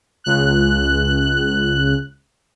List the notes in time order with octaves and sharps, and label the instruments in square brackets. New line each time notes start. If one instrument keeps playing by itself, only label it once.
[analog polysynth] C#2 F#6